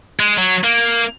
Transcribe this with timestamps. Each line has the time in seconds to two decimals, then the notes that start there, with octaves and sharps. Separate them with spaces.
0.20 G#3
0.37 F#3
0.64 A#3